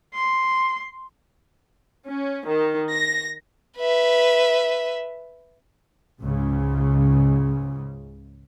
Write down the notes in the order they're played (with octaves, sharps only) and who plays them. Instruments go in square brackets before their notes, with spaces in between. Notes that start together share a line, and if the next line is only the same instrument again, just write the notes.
[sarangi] C6
[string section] C#4
D#3
A#6
[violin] B4 E5
[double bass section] C#2 G#2 C#3